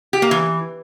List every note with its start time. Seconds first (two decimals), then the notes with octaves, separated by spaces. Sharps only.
0.13 G4
0.22 A#3
0.31 E3